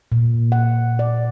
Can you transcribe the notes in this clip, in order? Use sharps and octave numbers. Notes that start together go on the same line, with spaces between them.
A#2
F#5
D5